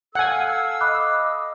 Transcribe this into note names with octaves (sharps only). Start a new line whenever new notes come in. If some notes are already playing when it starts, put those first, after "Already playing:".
A4 F5 F#5 G#5 E6
D#5 B5 D6 F#6